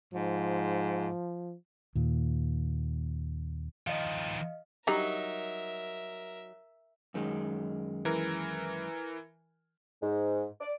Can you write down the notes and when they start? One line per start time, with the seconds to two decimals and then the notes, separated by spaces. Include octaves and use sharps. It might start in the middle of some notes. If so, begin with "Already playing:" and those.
0.14 G#2 F3
1.95 D#2 A#2
3.87 D#3 F3 D#5 F5
4.87 F#3 G3 D#4 A#4 E5 A#5
7.14 F#2 D#3 G#3
8.05 E3 A#4
10.01 G#2
10.61 D5